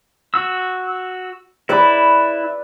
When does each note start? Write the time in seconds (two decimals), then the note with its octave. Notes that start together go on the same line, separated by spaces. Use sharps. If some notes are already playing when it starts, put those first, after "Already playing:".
0.34 F#4 E6
1.69 E4 B4 D5 B5